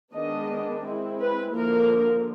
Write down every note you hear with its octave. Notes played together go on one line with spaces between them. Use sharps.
D#3 G#3 B3 D4 D#5
G#3 C4 E4
B4
D3 F3 A#3 A#4